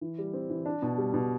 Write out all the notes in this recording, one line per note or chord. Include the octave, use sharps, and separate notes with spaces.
E3
G3
C4
E3
D4
B2
G3
B2